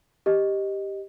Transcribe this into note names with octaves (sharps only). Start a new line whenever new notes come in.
G4 D#5